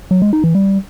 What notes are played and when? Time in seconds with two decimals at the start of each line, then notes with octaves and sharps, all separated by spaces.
0.11 F#3
0.22 G#3
0.33 D#4
0.44 E3
0.55 G3